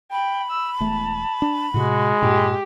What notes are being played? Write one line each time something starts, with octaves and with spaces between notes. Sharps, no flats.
G5 B5
E6
E1 E2 A3 A5
D4
A2 C3 G#3 F#4
G2 A#2 G4